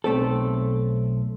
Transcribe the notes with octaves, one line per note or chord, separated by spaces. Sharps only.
B1 A3 C4 A4